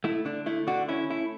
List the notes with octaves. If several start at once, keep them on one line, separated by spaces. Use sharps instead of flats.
A3 E4
D3 D4
A3 E4
D3 D4 F#4
C#4 E4
A3 E4